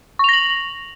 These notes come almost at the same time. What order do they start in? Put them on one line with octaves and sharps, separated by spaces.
C#6 F7 A#6 F#7